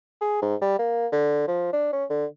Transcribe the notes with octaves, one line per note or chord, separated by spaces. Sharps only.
G#4
G#2
G3
A#3
D3
F3
D4
C#4
D3